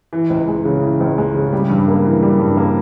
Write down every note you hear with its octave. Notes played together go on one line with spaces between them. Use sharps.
E3
C#2
G#3
C#3
E3
C#2
G#3
C#3
G3
G2
A#3
E3
G3
G2
A#3